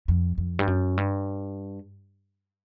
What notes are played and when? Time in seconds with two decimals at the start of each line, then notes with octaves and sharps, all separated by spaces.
0.08 F2
0.38 F2
0.59 G2
0.67 F#2
0.97 G2